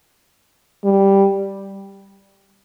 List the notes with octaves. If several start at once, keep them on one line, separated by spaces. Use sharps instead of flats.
G3